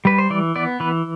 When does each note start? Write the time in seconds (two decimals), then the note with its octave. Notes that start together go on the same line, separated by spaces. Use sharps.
0.05 G3 B4
0.18 C5
0.30 E3 D5
0.56 B3 D5
0.80 E3 B4